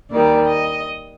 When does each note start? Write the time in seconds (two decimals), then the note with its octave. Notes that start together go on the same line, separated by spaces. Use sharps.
0.10 D#2 D#3 G3 D5
0.49 D#5